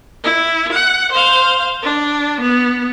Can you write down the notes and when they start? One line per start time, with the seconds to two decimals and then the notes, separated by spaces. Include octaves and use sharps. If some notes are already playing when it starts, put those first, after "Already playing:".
0.24 E4
0.72 F#5
1.12 C5 F5
1.83 D4
2.41 B3